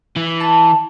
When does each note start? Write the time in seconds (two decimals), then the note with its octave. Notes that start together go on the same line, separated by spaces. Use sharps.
0.16 E3
0.40 A5